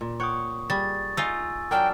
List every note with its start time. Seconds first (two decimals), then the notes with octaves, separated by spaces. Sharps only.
0.01 A#2
0.20 C#5 F#5 G5 C#6 D#6
0.70 G3 G#4 A6
1.17 D#4 F4 G#5 E6
1.71 F#3 D4 A#4 G5 D6 F6